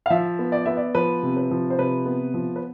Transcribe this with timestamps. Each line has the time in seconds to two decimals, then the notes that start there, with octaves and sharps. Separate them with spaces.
0.06 F5
0.10 F3 E5
0.39 B3
0.52 D5
0.66 B3 E5
0.77 D5
0.95 F3 B4
1.23 C3
1.37 B4
1.51 F3
1.70 C5
1.78 C3 B4
2.06 B3
2.34 F3
2.56 B4